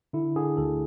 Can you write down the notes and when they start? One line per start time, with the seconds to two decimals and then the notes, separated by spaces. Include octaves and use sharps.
0.13 D3 E4
0.36 D3 G#4
0.57 D2 A4